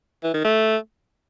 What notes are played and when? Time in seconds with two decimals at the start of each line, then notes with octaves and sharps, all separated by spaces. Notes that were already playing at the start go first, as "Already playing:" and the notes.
0.24 E3
0.34 D#3
0.44 A3